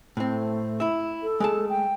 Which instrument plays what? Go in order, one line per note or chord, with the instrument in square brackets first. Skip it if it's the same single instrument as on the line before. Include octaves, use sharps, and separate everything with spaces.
[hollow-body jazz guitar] A2 C4 [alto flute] A3
[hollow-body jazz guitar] E4 E5
[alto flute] A4
[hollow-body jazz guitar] G#3 A3 A5
[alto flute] G5